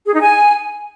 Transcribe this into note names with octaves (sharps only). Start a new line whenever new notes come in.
G#4
D#4
G#5